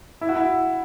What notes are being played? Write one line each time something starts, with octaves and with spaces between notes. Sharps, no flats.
E4
F#4
E4